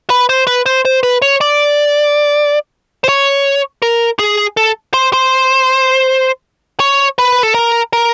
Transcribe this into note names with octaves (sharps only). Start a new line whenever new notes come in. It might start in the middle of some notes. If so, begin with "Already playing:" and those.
B4
C5
B4
C5
C5
B4
C#5
D5
C5
C#5
A#4
G#4
A4
C5
C5
C#5
B4
A4
A#4
A#4